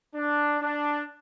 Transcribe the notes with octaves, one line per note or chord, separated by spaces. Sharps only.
D4
D4